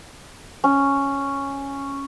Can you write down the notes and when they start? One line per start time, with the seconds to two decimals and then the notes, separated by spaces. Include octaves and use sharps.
0.64 C#4